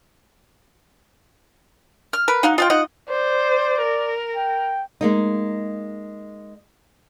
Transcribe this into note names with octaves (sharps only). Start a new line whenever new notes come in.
F6
A#4 B4
F#3 D#4 F5 F#5
F4 D#5 F#5 G5
D#4 F4 D#5 F#5
C5 D5
A#4
G5
G#3 A#3 D#4